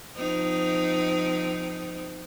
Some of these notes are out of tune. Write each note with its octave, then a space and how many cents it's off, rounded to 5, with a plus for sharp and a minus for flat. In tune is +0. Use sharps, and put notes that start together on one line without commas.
F3 +15 C4 -30 D#4 +0